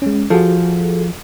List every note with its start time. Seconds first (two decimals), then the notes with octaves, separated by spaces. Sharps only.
0.02 G#3 C#4
0.30 F3 F#4 G#4 A4